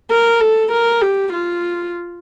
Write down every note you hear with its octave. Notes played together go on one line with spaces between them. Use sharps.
A#4
A4
A#4
G4
F4